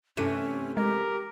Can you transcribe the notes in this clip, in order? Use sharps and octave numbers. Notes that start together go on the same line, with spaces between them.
G2 C3 E3 A3 C#4 D#7
G#3 G4 A#4